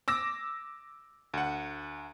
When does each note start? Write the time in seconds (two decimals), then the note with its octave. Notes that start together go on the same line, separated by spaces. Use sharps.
0.08 D6 E6 A#6
1.34 D2 F#5